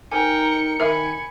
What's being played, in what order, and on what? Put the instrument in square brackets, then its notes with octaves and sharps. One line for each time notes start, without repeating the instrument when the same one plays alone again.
[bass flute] D#4 [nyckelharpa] A#4 G5 [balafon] G#5 [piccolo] C#7
[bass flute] D#3 [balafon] A#4 E5 [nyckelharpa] G#5 B5